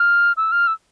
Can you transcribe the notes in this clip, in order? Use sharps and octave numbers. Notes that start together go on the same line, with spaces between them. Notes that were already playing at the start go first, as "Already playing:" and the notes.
Already playing: F6
E6
F6
E6